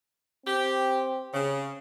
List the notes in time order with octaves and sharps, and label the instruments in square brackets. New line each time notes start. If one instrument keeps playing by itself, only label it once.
[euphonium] C4 [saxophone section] G4
[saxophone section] C#3